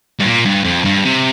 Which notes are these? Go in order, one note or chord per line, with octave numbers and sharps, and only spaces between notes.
G2
A#2
G2
F2
G2
C3